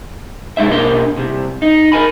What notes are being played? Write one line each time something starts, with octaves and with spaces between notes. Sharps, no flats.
C3 G#3 D#4 E5
B2 A#3 D4 A#4 C6
C2 C3
D#4
A#4 G#5 B5